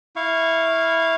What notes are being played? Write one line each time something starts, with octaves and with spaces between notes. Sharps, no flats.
E4 F5 C#6